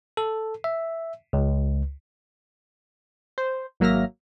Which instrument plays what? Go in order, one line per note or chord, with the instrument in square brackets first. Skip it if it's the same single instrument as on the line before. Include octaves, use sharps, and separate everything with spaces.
[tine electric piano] A4
E5
C#2
[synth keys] C5
G#1 F#3 A#3 E5 F6 A#6